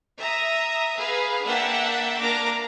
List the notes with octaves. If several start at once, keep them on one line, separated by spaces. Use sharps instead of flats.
E5 A#5 D#6
G#4 B4 F5
A#3 D4 E5 F#5 G5 A5
A#3 D4 A#4 A#5 D6